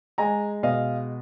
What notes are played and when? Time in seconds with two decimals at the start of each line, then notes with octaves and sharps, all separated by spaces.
0.18 G#3 G#5 A#5
0.63 B2 D#5 F5